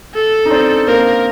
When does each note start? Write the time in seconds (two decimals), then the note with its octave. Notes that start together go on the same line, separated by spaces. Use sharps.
0.14 A4
0.45 D#4
0.51 C4 D4
0.87 A#3 C4 A#4